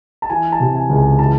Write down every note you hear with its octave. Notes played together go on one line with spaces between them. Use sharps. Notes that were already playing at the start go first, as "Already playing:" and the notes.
A5
E3 G#5
A5
C3
G#5
C#2
G#5
E3 A5